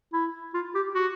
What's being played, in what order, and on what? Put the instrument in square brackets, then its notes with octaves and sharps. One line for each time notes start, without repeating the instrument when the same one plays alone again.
[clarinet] E4
F4
G4
F#4